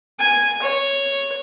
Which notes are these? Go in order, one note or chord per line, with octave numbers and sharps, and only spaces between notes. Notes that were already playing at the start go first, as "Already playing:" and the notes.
G#5
C#5